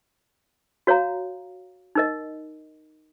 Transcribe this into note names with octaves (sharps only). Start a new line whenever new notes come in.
F#4 C#5 F5 A#5
D#4 A#4 D#5